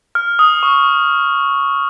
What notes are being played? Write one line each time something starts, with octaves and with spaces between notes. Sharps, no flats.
F6
D#6
C#6